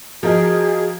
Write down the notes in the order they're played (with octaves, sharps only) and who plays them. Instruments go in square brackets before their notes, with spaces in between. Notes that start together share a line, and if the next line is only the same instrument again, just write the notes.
[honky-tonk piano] F3 A#4 D#5 [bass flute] F#4 [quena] G#4